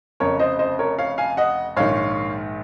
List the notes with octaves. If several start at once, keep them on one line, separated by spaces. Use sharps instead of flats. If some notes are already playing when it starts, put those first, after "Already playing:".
F1 F2 C#3 A#4 C#5
C5 D#5
C5 D#5
A#4 C#5
C#5 F5
F5 G#5
D#5 F#5
A#1 G#2 D#3 C#5 F5